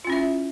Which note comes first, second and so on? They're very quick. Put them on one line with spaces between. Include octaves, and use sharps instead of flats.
F4 C#4 E4 E5